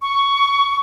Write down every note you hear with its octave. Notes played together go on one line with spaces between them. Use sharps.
C#6